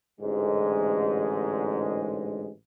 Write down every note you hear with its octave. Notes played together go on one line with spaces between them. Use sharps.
A1 G#2 D3 G#3